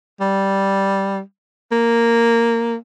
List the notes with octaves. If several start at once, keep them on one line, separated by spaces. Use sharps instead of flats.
G3
A#3